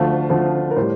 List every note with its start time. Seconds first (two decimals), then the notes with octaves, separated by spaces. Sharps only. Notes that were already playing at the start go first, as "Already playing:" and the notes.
Already playing: D2 D3 F3 A3 F4
0.30 D2 D3 F3 A3
0.71 A#4
0.76 A2 G3 C5